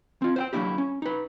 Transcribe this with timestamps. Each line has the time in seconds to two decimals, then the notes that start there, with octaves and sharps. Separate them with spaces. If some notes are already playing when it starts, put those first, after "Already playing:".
0.22 C4 F4
0.36 C5 F#5 G5
0.53 F#3 G#3 A#3 D4 E4 G4
0.78 C#4
1.02 D#4 B4